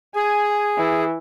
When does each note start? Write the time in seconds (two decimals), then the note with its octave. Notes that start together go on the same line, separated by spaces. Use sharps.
0.15 G#4 G#5
0.78 E3